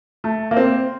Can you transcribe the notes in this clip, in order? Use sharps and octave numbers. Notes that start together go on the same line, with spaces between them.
A3
A#3
C4